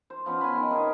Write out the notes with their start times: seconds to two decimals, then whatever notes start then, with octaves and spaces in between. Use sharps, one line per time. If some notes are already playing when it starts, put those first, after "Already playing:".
0.10 C5
0.26 F3 B3 C#4
0.41 G#5 B5
0.56 D#3
0.71 C3 G#4 A#4